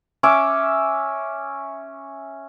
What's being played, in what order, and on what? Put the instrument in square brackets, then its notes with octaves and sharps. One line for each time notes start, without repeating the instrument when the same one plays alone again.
[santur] C#4 E5 D6